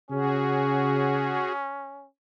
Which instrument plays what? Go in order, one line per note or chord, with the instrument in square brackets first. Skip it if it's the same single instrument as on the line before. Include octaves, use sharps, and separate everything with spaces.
[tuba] C#3 [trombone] C#4 [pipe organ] F#4 G#4